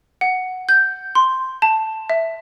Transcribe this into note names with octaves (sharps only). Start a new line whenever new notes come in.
F#5
G6
C6
A5
E5